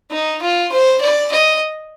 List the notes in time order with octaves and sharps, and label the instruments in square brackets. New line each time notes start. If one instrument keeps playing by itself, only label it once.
[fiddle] D#4
F4
C5
D5
D#5